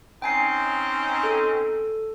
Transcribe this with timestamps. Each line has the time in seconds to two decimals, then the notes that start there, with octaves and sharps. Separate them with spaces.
0.22 C4 C#4 D#4 G5 G#5 C7
1.23 A4